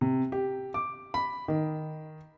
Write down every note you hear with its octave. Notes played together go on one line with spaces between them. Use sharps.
C3
G4
D6
B5
D#3